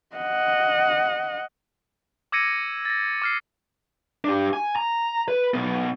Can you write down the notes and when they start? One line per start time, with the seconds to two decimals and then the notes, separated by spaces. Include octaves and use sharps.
0.16 D#5 F#5
2.32 D6 E6 G#6 A#6 C#7 D#7
2.85 A6 A#6
3.22 D6 F6 C7
4.24 D4 G4
4.53 G#5
4.76 A#5
5.28 B4
5.54 B1 B3